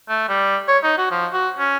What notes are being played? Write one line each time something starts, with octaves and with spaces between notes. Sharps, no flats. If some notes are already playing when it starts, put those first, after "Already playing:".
A3
G3
C#5
D#4
F#4
F3
F#4
C#4